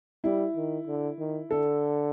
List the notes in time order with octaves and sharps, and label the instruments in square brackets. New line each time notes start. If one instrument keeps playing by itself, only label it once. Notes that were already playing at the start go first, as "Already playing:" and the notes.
[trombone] G3 [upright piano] E4
[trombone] D#3
D3
D#3
[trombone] D3 [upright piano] A4